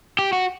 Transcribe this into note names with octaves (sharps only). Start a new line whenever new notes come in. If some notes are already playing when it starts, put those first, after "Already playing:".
G4
F#4